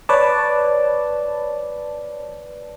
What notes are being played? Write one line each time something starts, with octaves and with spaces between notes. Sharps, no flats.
B4 C#5 D5 A5